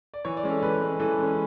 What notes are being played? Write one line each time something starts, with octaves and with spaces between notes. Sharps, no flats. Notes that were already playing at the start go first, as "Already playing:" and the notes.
D5
E3 C#5
D5
G#3 C#4
A4
E3 B4
G#3 C#4
E3 A4
G#3 C#4